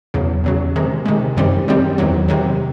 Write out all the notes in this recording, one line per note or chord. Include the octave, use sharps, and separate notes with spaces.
E2 C#3 F#3
E2 C#3 F#3
C3 D#3 G#3
C3 D#3 G#3
F#2 D#3 G3 C4
F#2 D#3 G3 C4
E2 C3 D#3 F#3
E2 C3 D#3 F#3